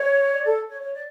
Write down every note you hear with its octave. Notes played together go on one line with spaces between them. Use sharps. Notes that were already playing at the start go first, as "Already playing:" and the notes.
Already playing: C#5
D5
A4
C#5
C#5
D5